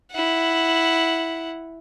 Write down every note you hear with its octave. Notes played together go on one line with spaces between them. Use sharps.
E4 F#5